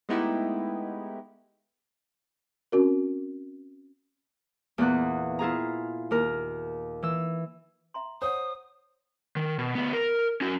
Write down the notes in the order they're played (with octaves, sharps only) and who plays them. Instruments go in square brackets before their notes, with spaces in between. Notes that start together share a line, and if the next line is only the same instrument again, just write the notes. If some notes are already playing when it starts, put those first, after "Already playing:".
[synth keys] G#3 A3 B3 D#4 E4 G4
[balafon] C4 C#4 F#4 A#4
[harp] E2 A#2 B3 F#6
E4 F4 G#4 A#5
D#2 A#4
E3 E6
[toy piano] E5 A#5 C6
[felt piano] C5 [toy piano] C#5 F#5 [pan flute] D#6
[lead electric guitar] D#3
B2
D2 B3
A#4
C#4 F#4